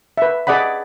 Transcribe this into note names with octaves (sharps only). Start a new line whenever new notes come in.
B4 E5
G#4 D5 D#5 F#5 B5